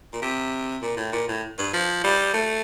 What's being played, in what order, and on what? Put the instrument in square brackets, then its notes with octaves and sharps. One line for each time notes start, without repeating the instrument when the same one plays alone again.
[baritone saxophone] A#2
C3
A#2
A2
A#2
A2
G2
F3
G3
A3